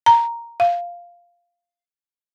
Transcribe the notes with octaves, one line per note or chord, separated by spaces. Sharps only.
A#5
F5